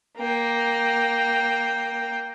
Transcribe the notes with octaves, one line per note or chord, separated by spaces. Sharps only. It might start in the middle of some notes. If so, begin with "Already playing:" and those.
A#3 G5